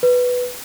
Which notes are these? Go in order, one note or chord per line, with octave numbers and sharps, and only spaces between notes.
B4